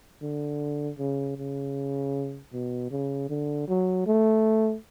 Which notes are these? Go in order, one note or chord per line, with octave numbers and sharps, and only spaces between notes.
D3
C#3
C#3
B2
C#3
D3
F#3
A3